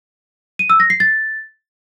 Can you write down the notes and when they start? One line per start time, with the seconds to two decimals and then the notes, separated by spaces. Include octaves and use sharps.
0.59 D#7
0.70 E6
0.80 A#6
0.90 C7
1.00 A6